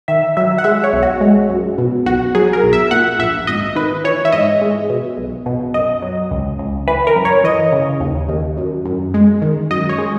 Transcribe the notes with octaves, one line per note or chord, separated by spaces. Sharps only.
D#3 E5
F#3 E5
F#5
G#3 E5
C#5
B1
F#4
G#3
F#2
B2
B1 F#4
F#3 G#4
A#4
B1
E5
A#2 F#5
A#1 E5
G#1 D#5
D#3 B4
E3 C#5
E5
G#2 D#5
G#3
B2
B1
B2
F#2 D#5
F#3
C#2
C#2
E3 B4
A#4
F#2
C#5
E3 D#5
C#3
D#2
D#2
F#2
F#2
G#3
D#3
F#2 D#5
C#5
G#3